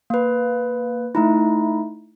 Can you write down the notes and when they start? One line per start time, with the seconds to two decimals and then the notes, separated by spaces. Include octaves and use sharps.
0.10 A#3 B4
1.15 A3 D#4 E4